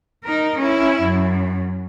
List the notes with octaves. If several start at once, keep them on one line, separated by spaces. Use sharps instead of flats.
D#4 A#4
C#4 E4
F#2